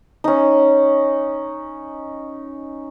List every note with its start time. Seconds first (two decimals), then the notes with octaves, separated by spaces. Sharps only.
0.24 C#4 D#4